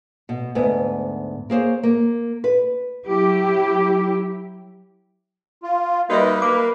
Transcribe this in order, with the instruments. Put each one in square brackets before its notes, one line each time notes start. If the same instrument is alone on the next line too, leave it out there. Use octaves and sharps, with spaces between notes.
[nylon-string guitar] B2
D2 G#2 B3
A#3 G#4 C5 C#5
A#3
B4
[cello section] F#3 E4 G4
[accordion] F4
[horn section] G3 A#3 D#4 [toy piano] F#4 D#5 E5 [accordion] B4
[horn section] A#3 [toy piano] D6